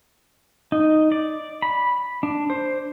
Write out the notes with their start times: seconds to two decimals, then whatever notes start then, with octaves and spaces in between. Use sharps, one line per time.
0.72 D#4
1.12 D5
1.62 B5
2.23 D4
2.50 C5